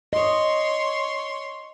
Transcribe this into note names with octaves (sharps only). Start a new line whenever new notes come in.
C#5 D#5 C6